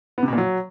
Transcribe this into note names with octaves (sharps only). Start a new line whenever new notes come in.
B3
C3
B2
A#2
F#3